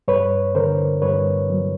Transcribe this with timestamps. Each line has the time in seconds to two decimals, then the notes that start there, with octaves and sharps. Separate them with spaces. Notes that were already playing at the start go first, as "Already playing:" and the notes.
0.08 G2 B4 C#5
0.55 D3 A#4 C5
1.02 G2 B4 C#5
1.50 F#3